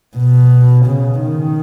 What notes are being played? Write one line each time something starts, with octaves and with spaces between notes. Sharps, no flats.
B2
C#3
D#3